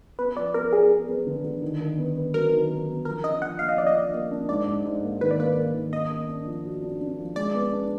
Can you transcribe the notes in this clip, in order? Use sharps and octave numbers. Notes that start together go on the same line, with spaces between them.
B3 B4
F3 D5
B3 A#4
B3 G#4
B3
B3
D3
D3
D#3
D#3
B3
B3
F#3 A#4
D#3
F#3
B3
F3 A#4
D4 D#5
F3 F#5
A#3 F5
D#5
F3 D5
D#5
D4
A#3
D4
G#2 D5
G#2
G#2
A#3
D#3 B4
D5
A#3 B4
A#3
D#3
A#3 D#5
D4
D4
F3
F#4
D4
D4
F3
G#3 D5
B3
D4